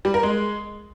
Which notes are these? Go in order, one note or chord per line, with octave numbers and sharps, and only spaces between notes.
G3
A#4
G#3